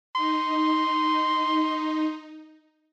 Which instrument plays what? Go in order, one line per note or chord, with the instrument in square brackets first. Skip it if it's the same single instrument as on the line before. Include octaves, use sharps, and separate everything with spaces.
[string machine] D#4 [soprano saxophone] C6